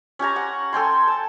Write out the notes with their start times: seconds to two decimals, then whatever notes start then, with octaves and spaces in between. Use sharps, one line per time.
0.19 C#4 G4 G#5 A#5
0.36 F#5
0.73 A4 G5 G#5 C6
1.08 A5